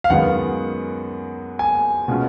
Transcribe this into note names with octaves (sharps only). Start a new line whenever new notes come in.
F5
F#2 D#3 G#3 B3 F#5
G#5
B2 G#3 C#4 F4